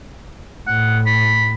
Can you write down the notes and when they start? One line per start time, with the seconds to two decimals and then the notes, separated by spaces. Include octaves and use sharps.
0.67 A2 F#5
1.06 B5